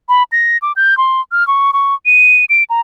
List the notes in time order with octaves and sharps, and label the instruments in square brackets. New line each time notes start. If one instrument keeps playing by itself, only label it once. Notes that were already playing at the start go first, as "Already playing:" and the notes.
[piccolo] B5
A#6
D6
G6
C6
F6
C#6
C#6
D#7
D7
A#5